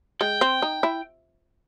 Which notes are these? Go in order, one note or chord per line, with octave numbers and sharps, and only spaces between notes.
G#3 G5
C4
D#4
E4